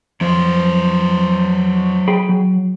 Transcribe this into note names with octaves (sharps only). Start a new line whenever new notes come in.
F2 F#3 C5
G#4 G5 B5
F#3